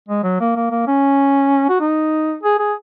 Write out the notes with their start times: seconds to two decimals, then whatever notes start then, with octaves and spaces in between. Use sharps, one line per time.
0.09 G#3
0.24 F#3
0.40 A#3
0.56 A#3
0.71 A#3
0.87 C#4
1.69 F#4
1.80 D#4
2.43 G#4
2.59 G#4